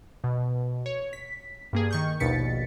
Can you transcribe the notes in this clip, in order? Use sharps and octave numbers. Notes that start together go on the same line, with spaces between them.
B2
C#5
B6
G2 A#3 G#4
D#3 C#6 G6
A#1 D#2 B2 A6 B6 C#7